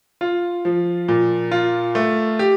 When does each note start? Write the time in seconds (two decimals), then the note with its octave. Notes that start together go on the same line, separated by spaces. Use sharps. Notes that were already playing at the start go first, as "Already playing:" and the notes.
0.21 F4
0.65 F3
1.08 A#2
1.51 F4
1.95 A3
2.39 G4